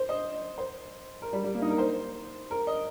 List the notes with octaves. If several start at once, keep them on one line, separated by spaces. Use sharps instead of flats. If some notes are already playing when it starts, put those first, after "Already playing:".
Already playing: C5
D#5
C5
A#4
G3
G3
A#3
D#4
A#4
C5
A#4
D#5